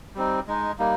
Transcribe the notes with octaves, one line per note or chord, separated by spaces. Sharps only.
G3 C4 D#4
G#3 D#4
G3 A#3 D#4